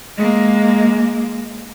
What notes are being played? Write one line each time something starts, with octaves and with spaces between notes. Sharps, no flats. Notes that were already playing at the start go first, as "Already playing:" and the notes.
G#3 A#3